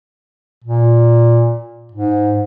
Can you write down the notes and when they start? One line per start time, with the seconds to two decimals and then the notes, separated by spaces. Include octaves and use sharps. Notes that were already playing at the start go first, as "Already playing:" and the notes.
0.64 A#2
1.92 G#2